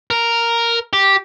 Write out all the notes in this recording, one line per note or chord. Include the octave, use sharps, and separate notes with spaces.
A#4
G4